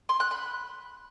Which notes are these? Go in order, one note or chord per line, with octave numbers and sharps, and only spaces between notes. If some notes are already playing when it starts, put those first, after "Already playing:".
C6
F#6
B5